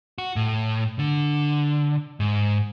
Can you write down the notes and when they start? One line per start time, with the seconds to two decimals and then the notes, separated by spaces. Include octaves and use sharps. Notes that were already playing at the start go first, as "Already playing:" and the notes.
0.18 F#4
0.36 A2
0.99 D3
2.20 G#2